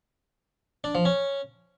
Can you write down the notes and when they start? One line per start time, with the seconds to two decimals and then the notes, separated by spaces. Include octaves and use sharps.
0.84 D4
0.95 F3
1.05 C#4